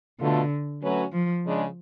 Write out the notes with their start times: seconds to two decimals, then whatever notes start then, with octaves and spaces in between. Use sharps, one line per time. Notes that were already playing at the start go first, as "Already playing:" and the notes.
0.19 B2 D3 A3 F4 A4
0.82 F#3 A3 C#4 F#4 B4
1.12 F3
1.43 C#3 G#3 D4